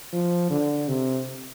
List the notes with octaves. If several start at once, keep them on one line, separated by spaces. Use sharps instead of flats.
F3
D3
C3